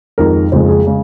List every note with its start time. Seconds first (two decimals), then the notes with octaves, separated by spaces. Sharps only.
0.18 F2 D#3 G#3 A#4
0.52 F#1 F2 C#3 G#3 C5
0.68 G#4
0.87 C#3 G#3